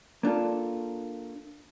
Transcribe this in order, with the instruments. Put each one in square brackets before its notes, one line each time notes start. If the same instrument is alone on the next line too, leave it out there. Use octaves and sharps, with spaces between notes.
[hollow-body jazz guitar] A#3 D4 F4 A4